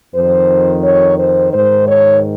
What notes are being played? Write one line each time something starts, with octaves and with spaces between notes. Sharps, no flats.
F2 D#3 C5
C#5
C5
G#2 D#3 C5
C#5